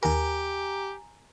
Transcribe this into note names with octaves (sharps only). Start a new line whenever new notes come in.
D#2 G4 A#4 G#5 A#5